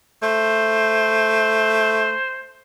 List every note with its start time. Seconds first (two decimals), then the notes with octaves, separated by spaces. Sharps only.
0.23 A3 C5